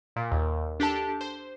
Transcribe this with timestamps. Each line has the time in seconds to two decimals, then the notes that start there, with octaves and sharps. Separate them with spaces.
0.16 A#2
0.32 D#2
0.80 D4 G4 A4 A5
1.21 C5